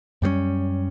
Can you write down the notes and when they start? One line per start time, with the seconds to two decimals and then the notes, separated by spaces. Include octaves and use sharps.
0.22 F#2 G3 A#3 C#4